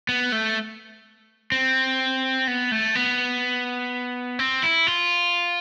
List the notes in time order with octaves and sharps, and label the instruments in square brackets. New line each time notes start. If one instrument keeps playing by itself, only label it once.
[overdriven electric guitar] B3
A3
C4
B3
A3
B3
C4
E4
F4